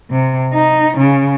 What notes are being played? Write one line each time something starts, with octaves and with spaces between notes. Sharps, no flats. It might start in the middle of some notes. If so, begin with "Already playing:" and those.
C3
D#4
C#3